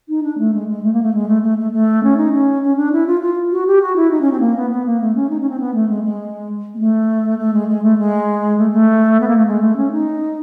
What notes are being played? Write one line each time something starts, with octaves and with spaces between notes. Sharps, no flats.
D#4
D4
A3
G#3
G#3
A3
A#3
A3
G#3
A3
A3
A3
A3
C#4
D#4
C#4
C#4
D4
E4
F4
F4
F#4
G4
F#4
E4
D#4
C#4
C4
A#3
B3
B3
A#3
A3
C#4
D#4
C#4
C4
B3
A3
G#3
G#3
A#3
A3
A3
G#3
G#3
A3
G#3
A3
A3
B3
A#3
A3
G#3
A3
C#4
D#4